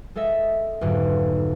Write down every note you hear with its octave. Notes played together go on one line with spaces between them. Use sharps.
G#3 A4 D#5 E5
B1 F2 G#2 D3